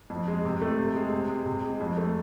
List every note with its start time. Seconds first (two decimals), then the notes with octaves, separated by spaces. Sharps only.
0.10 F2
0.28 G#3
0.45 C3
0.62 A3
0.79 C3
0.96 G#3
1.13 C3
1.29 G#3
1.46 C3
1.64 G#3
1.80 F2
1.98 A3